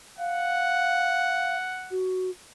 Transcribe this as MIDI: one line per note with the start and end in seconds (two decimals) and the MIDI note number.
0.18 1.57 77
0.18 1.97 78
1.91 2.30 66